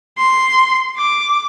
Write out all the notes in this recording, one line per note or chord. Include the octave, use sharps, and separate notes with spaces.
C6
D6